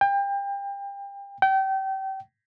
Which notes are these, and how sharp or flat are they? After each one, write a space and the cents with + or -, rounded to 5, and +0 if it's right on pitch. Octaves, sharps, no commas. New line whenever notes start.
G5 +30
G5 -30